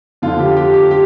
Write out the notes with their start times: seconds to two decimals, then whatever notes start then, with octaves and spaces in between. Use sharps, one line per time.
0.22 F2 D3 F4
0.39 G4
0.57 G4
0.73 G4
0.91 G4